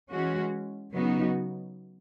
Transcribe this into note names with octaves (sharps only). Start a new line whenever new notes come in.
E3 G#3 C#4 F#4
C#3 F#3 B3 D#4 F#4